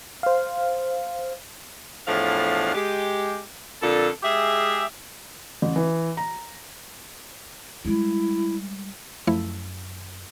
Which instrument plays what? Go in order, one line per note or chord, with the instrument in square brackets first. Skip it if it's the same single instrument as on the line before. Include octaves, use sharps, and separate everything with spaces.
[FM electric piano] C5 F5
[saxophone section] E2 A2 F3 D4 F5
G#3 G4
F2 A#2 D3 A4
G#3 G4 G#4 E5
[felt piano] A1
E3
A#5
[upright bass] G3 G#3 [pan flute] E4
[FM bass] F#2 [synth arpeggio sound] F3 A3 E4